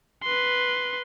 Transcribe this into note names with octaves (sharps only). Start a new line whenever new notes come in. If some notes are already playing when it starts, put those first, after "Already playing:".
B4 C6